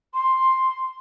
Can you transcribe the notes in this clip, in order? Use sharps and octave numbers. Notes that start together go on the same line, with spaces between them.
C6